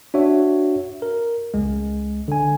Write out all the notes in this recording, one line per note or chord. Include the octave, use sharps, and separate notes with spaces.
D4 F#4 C#5 E5
A#4
C#2 G#3
D3 G#5